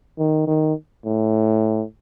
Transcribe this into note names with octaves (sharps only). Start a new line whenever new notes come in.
D#3
D#3
A2